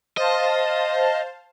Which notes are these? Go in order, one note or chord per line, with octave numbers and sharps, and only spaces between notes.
C5 D#5 F5 A5